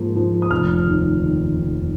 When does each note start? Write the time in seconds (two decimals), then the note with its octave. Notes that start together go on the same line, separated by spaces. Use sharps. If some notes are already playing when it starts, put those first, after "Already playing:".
Already playing: G#2 F3 A#3
0.16 F3
0.42 D#6
0.51 F1 F6
0.86 D#2
1.20 D#3
1.56 F1